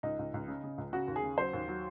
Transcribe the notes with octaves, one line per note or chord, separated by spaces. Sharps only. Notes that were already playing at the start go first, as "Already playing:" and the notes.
C#2 D#4
C#2
C#2
C#3
C#3
C#2
C#3 F#4
D#2
G#4
C#3
F#3 C5
D#2
F#3